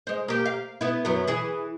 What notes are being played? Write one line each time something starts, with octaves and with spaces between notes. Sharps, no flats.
G#3 C5
A#3 G4
F5
B3 E4
F#2 F#3 B3
E3 G#4